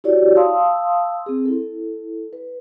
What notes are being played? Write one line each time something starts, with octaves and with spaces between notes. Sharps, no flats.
E4 F#4 G4 C#5 D5
F5 A5 C6 D#6 E6
C4 G#4
E4 A4
B4